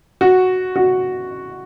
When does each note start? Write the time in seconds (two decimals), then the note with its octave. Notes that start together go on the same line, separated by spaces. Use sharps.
0.21 F#4
0.76 F#4